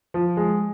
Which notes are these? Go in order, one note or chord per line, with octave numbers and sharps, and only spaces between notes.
F3
G#3